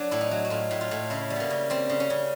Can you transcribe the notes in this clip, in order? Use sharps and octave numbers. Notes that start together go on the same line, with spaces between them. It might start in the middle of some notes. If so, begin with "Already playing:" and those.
Already playing: F#3 D4
A2 E4
D#4
F#3
F#4
A2 F4
A2
F4
A2
C#3 E4
G3
A#3 B3
C#3
G3 C4
C#3
C#4
C#3